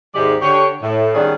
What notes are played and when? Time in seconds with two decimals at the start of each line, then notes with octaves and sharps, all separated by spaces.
0.15 D#2 G#2 C3 G#3 G4 D5
0.41 D3 G4 C#5
0.82 A2
1.15 D#3 G3 B3 C#4 D4 G#4